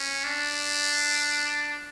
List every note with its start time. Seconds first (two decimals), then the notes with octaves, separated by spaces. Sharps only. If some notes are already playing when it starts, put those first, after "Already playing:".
Already playing: C#4
0.24 D4